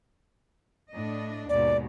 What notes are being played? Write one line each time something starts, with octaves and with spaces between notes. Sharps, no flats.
A2 D4 D#5
D#2 G#2 B2 D5